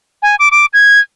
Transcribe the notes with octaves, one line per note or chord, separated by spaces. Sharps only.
G#5
D6
D6
G#6